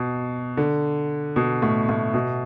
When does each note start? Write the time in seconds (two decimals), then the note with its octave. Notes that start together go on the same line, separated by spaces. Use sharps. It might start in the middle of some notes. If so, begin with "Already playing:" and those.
Already playing: B2
0.57 D3
1.36 B2
1.62 A2
1.89 A2
2.14 B2